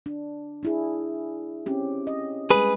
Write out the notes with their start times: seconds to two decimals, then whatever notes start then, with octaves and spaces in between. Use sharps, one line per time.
0.06 D4
0.63 D4 E4 G#4
1.66 C4 C#4 G4
2.07 D#5
2.50 G3 G#3 G#4 B4